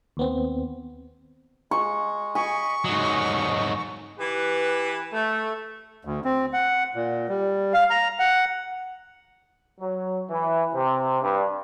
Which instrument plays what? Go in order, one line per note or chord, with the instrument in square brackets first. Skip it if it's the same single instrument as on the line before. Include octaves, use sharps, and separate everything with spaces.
[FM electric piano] D#2 B3 C4
[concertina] G#3 [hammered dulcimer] C#6
[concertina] D#5 B5 [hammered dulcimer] G#5 [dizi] C#6
[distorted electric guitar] G#2 F#3 [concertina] D#5
[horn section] E3 G4 B4
A3
[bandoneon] D2
C4
F#5
A#2
G3
F5
A#5
F#5
[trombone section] F#3
E3
C3
G2